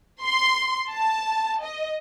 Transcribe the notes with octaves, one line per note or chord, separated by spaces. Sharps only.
C6
A5
D#5